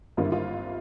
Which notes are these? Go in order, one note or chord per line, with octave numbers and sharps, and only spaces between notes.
G#1 G2 D3 G3 A#3 F4
E4
F4